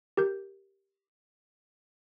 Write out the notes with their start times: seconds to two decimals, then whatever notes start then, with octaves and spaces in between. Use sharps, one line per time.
0.17 G4 A#4 G6